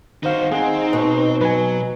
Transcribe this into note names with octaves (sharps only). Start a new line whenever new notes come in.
D#3 D#4 F#4 C5 F5
C4 D#4 G#4 F#5 G#5
B2 B4 D#5
F#3 B4 G#5